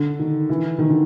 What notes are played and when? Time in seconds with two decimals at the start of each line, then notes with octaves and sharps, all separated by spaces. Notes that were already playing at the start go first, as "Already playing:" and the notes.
Already playing: D3
0.19 D#3
0.49 E3
0.78 D#3
0.89 D3